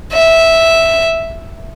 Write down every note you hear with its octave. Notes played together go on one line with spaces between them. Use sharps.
E5